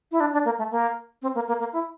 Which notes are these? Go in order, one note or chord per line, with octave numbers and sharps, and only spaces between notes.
E4
D4
D4
A#3
A3
A#3
C4
A#3
A#3
A#3
E4